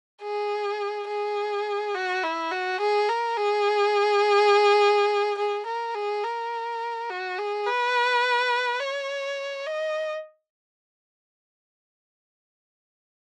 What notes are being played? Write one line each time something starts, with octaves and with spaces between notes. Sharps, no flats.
G#4
G#4
F#4
E4
F#4
G#4
A#4
G#4
G#4
A#4
G#4
A#4
F#4
G#4
B4
C#5
D#5